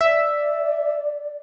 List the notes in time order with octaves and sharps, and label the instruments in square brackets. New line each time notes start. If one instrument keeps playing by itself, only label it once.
[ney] D5 [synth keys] E5